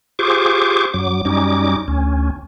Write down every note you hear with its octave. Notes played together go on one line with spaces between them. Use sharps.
F4 G4 G#4 C5 C#6 D6
F#2 F#3 D6
F#2 G3 C#4 D#4 D6
D2 C#4